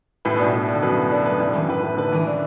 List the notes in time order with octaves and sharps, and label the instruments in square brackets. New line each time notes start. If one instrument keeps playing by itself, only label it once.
[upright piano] A2 [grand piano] B4
[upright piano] B2
[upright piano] A2 [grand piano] D4
[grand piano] D4
[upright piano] D3 [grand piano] D4
[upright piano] F#2 B2 [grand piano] B4
[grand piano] B4
D4
[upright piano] F#2 [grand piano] B4
[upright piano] A2 [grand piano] D4
[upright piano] F#2 [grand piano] E3
[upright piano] A2 [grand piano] B4
[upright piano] A2 [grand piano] B4
[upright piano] A2 D3 [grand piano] B4
[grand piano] E3
D4